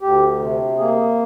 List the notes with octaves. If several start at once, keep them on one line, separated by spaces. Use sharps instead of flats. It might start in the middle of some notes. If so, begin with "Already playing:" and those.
D2 G4
C3
A#3 G#4